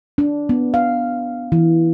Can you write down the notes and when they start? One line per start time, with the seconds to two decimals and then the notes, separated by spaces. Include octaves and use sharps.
0.18 D4
0.49 B3
0.74 F5
1.52 E3